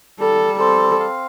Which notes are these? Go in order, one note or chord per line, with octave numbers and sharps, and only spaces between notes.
G3 A4
C4 A4
F5